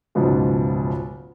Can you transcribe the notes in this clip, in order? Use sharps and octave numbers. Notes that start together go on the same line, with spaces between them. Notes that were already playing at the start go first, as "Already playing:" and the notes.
F#1 C#2 G#2 B2 F3